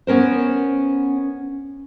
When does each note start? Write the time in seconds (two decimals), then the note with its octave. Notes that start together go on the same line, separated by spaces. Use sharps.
0.07 B3 C#4 A#4 C5